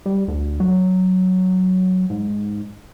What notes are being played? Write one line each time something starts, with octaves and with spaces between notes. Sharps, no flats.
G3
D2
F#3
G#2